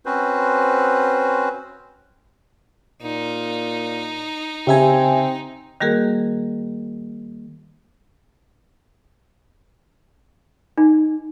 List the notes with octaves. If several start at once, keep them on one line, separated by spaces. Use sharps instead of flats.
C4 C#4 F#4 B4 C5
A#2 D#4
C#3 C4 G4 E5 G#5
D#3 G3 A#3 F#4 G#4 A#4
D#4